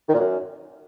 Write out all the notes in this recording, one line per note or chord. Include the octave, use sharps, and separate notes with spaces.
D#3
A#2
F#2